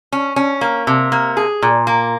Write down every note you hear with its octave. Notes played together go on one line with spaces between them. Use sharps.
C#4
C#4
A#3
C3
A#3
G#4
A#2
A#3